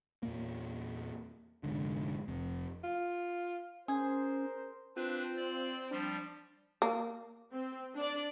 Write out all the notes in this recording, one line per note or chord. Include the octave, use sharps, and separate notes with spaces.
E2 A#2 A#3
F1 B1 G#2 D3
F1 F2
F4
C#4 G#4 A#4 C5
C4 D4 F4 B4
D5
F3 G3 D4
A#3
C4
D4 D5